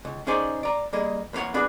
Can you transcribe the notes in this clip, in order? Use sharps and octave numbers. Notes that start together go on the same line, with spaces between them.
C#2
C#4 D#4 G#4 C5 D5
D5 A#5
G3 A#3 G#4 D#5
E2 A#3 D#4 C#5 F#5
B3 D4 F#4 G#4